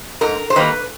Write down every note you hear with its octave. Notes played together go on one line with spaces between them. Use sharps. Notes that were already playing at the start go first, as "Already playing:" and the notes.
G#2 A#4
C5
D#3 G3 A#3 B4